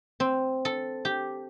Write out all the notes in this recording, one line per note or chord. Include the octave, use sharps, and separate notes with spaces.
C4
A4
G4